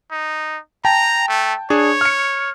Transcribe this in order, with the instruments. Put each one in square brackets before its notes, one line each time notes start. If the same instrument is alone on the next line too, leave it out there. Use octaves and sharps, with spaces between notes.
[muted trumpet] D#4
[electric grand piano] G5 A5 [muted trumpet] A#5
[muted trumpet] A3
[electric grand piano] D4 G#4 [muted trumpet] C#5
[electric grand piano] F6 C#7